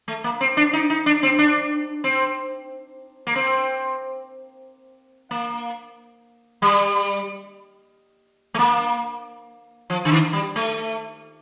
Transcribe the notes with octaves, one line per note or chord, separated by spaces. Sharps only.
A3
A#3
C4
D4
D#4
D#4
D4
C4
D4
C4
A#3
C4
A#3
G3
A3
A#3
F3
D3
D#3
G3
A3